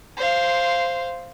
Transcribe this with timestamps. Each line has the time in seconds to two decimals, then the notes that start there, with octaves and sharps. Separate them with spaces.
0.17 C5 F5